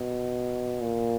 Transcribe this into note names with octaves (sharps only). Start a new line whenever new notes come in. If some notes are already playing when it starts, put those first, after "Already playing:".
Already playing: B2
A#2